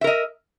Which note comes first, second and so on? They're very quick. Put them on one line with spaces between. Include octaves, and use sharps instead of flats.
E5 A#4 D#5